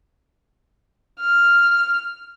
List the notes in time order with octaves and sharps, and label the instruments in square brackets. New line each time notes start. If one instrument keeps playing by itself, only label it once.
[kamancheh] F6